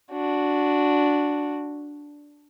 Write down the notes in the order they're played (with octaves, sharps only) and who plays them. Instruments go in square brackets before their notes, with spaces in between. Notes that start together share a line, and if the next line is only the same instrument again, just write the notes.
[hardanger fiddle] D4 F#4